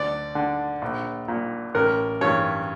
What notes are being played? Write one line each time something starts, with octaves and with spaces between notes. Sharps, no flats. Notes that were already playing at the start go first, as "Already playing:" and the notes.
Already playing: D2 D5
D3
A#1
A#2
A1 A#4
G2 E3 C#5